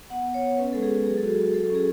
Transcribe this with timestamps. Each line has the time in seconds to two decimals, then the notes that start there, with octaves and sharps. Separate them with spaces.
0.10 B3 F#5
0.26 B3
0.34 C#5
0.42 B3
0.58 C#4 B4
0.73 G#3 A4
0.83 G#4
0.90 G#3
1.06 F#3 G#4
1.18 F#4 A4
1.29 G#4
1.38 F#4
1.54 F#3 A4
1.70 C#4 G#4